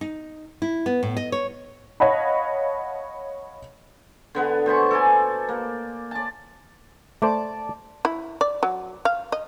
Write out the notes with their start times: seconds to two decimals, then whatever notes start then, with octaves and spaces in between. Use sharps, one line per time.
0.01 D#4
0.62 E4
0.86 B3
1.03 A2
1.17 D#5
1.32 C#5
2.00 C#5 D#5 F5 F#5 A5 B5
4.35 D3 B3 B4
4.66 B2 C5 B5 C#6
4.91 A4 D5 G#5
5.49 A#3
6.11 D5 A5
7.22 A3 C5 D5 A5 D6
8.05 E4
8.41 D5
8.63 F#3
9.05 F5
9.32 D#5